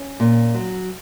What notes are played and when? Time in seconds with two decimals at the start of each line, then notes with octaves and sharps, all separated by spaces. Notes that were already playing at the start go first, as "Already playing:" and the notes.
Already playing: C#4
0.20 A#2
0.55 F#3